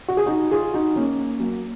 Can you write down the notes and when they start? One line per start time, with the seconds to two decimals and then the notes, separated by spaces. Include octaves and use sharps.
0.08 F#4
0.17 G#4
0.26 D#4 F#4
0.51 F4 G#4
0.74 D#4 F#4
0.96 A#3 C#4
1.40 F#3 A#3